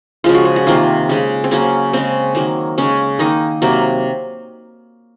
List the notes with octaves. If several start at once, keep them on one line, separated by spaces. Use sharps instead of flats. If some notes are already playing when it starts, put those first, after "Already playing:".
C#3 F3 G#3 F4
F#4
G#4
F#4
C3 D#3 A#3 F4
C#3 G#3
C4
C#3 F#3 A#3 C#4
C#3 G#3 C4
D#3 F#3 A#3
C#3 G#3 C#4
D#3 A#3 D#4
C3 F#3 A#3